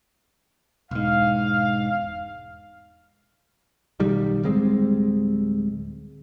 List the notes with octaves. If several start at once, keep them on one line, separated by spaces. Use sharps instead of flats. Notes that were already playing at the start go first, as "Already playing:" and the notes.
E1 G#2 F5
B1 D#3 G3
D1 G3 G#3 C4